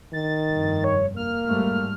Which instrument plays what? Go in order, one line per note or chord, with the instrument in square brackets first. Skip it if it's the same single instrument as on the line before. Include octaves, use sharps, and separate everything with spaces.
[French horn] D#3 [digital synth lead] A6
[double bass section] F1 G2
[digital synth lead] C#5
[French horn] A#3 [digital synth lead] F6
[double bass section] G#2 G3 A3